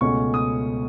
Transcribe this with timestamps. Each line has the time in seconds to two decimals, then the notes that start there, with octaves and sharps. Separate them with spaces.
0.01 C#2 B2 A3 C#4 C#6
0.34 D#6